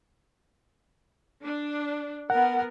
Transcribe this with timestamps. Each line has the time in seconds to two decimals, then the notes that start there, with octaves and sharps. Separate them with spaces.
1.43 D4
2.30 B3 A#4 F#5